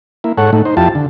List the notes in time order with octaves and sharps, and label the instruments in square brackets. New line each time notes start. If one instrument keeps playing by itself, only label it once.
[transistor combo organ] A#3 E4
G#2 A4 C#5 F#5
A2 A3 D#4
D#4 C5
F2 E4 F4 G4 A5
D3